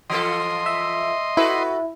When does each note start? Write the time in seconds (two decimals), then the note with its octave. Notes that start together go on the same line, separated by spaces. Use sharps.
0.10 E3 F4 A4 D#5 C6
0.66 E5
1.37 E4 F#4 A4 B4